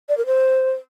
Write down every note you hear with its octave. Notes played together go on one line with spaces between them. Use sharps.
D5
A#4
C5